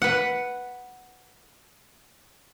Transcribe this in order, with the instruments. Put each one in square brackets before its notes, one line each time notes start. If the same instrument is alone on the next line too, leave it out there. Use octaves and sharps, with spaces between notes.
[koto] B4 F#5